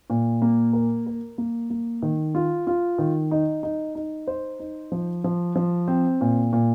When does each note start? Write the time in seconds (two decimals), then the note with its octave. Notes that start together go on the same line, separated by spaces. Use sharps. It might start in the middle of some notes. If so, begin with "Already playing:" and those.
0.10 A#2
0.42 A#3
0.73 A#4
1.06 A#4
1.38 A#3
1.70 A#3
2.02 D#3
2.35 F4
2.67 F4
2.98 D#3
3.31 D#4
3.63 D#4
3.95 D#4
4.27 C5
4.60 D#4
4.92 F3
5.24 F3
5.55 F3
5.88 C4
6.21 A#2
6.53 A#2